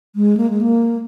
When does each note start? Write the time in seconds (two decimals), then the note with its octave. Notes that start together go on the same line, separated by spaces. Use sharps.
0.16 G#3
0.37 A#3
0.50 G#3
0.61 A#3